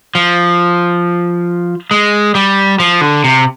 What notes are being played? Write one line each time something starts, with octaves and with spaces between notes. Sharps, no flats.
F3
G#3
G3
F3
D3
C3